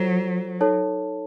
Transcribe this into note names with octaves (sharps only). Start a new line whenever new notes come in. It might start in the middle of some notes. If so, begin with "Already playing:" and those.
Already playing: F#3 F4 A4 C5
D#4 A4 C#5 A5